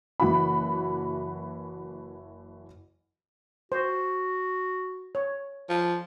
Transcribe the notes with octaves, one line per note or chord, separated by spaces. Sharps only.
F#1 E3 F#4 B5
F#4 C5
C#5
F3